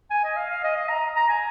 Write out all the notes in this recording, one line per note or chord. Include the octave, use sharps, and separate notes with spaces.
G#5
D#5
F5
F5
D#5
D#5
A#5
A#5
G#5